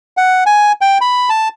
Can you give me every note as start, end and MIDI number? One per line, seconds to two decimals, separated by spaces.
0.17 0.44 78
0.46 0.72 80
0.81 0.98 79
1.01 1.29 83
1.29 1.48 81